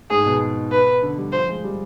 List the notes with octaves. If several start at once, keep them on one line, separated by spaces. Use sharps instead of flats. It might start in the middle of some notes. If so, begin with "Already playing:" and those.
G#2 G#4
B2
B4
D3
G3
F3 C5
G#3
G3